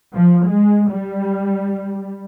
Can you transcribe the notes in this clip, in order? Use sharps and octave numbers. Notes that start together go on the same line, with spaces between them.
F3
G#3
G3